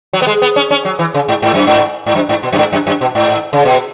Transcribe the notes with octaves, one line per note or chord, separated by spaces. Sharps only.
F#3
B3
G#3
B3
C#4
C#4
F#3
E3
C#3
G#2
G#2
F#2
G#2
G#2
F#2
G#2
B2
F#2
G#2
F#2
F#2
B2
G#2
C#3
B2